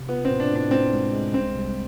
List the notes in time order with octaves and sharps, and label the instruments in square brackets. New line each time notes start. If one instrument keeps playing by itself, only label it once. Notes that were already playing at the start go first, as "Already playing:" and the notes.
Already playing: [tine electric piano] C3
[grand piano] B3 [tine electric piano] F4
[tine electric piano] A2 [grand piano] C4
[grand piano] D4
[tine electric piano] A2 [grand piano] D4
[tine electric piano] A2 [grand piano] C4
[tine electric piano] G#3
G#3
[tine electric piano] C2 [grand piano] C4
[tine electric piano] C2